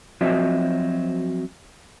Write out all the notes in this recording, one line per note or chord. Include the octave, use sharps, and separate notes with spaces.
F3 F#3 C4 F#4 D#5 E5